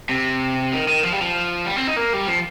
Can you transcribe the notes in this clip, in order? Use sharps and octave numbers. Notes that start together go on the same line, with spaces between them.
C3
D#3
D#3
F3
G3
F3
G3
C4
D#4
A#3
G3
F3